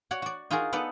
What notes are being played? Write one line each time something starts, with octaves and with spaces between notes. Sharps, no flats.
F#4 C#5 D5 F#5
F#4 D5
D#4 F4 F#4 G#4 A#4
B3 D#4 A4 D5 F#5